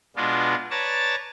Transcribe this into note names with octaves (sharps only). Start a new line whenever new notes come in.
B2 G#3 B3 D4 F4
B4 C#5 D5 A5 A#5 A6